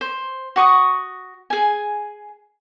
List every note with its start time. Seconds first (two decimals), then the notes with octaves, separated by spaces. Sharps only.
0.01 C5
0.56 F#4 C#6 D#6
1.50 G#4 G#5